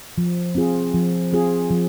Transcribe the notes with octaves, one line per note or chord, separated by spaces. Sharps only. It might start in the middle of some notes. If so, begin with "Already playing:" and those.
F3
C4 F4 G#4
F3
C4 F4 G#4
F3